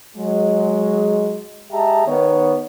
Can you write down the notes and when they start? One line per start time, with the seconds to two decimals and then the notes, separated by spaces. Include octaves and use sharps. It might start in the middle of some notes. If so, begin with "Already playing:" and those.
0.15 F#3 G#3
1.72 G#3 G4 G#4 E5 A5 A#5
2.07 D#3 B3 C#5